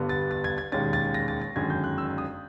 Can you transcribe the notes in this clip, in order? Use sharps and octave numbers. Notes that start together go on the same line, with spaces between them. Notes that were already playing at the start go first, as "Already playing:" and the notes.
Already playing: G1 G2 D3 G3 B3
A6
A6
G#6
G#6
E1 D#2 D#3 G#3 C#4 A6
A6
A#6
A6
A6
G1 F#2 D#3 G#3 G#6
G6
F#6
E6
D#6